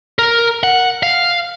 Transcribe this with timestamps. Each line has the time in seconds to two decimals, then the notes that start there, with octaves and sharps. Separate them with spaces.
0.19 A#4
0.63 F#5
1.03 F5